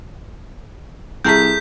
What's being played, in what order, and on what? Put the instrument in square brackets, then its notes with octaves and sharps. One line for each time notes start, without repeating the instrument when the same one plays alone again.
[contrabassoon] C2 [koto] A3 G#4 A#4 [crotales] G6 B6